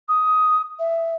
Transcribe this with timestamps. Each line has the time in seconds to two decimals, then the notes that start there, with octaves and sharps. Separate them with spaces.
0.08 D#6
0.79 E5